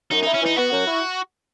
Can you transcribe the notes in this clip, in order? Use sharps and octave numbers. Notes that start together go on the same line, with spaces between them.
F#2 D#4
D#4
E4
C#4
E3 D#4
B3 F#4
F#2
E4